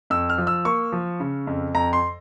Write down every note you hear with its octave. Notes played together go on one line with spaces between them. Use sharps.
F2 E6
F6
F3
E6
A#3 C#6
F3
C#3
F2
F2 A#5
C6